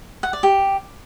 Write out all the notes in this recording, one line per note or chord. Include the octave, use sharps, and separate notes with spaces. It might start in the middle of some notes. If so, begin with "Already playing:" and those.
F#5
D5
G4